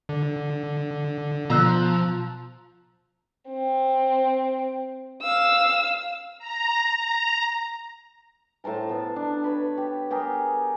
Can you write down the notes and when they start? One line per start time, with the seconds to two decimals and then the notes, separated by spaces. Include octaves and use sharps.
0.09 D3
1.50 B2 F3 A#5 E6 F#6
3.50 C4
5.23 F5 E6
6.39 A#5
6.98 A#5
8.64 A2 C5 A5 A#5
8.89 B3 A4 B4
9.16 D4
9.44 B4 C#5 B5
9.77 G4
10.10 B3 G4 G#4 A#4